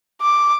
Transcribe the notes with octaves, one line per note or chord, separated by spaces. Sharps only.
D6